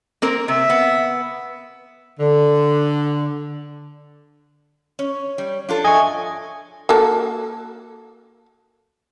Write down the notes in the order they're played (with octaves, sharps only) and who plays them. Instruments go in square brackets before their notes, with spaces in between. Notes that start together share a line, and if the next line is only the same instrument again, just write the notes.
[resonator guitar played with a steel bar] A#3 C4 A#4
[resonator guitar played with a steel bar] C3 [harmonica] E5
[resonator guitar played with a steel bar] B3
[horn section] D3
[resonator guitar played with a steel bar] C#4 [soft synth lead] C#5
[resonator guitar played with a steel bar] G3
[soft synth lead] F3 [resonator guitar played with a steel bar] D4 F4 A4
[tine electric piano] D#5 C#6 [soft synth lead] E5 [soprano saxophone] G#5
[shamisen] A#3 F#4 A4